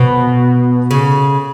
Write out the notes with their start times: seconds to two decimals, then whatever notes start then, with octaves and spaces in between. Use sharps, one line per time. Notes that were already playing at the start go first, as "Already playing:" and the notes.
Already playing: B2
0.91 C#3